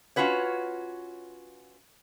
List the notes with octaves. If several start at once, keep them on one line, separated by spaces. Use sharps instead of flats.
C#4 F4 F#4 B4 C#5